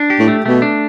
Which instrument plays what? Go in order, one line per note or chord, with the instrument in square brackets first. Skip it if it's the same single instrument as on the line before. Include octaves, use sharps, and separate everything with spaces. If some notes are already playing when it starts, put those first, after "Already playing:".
Already playing: [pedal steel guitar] D4
G4
[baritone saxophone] A2
[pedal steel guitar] A3
[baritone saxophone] B2 [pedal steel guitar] A3
[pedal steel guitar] D4